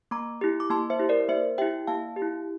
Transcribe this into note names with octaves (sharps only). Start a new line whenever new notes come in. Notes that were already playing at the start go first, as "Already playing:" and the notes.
A#3 A#5 D6
E4 G4
D6
A#3 A5 C6
C5 E5
E4 G4
A#4 D5
A#3 C5 E5
E4 G4 E5 G5
A#3 F5 A5
G4
E4